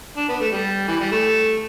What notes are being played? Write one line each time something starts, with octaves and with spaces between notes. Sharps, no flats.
D4
B3
A3
G3
E3
G3
A3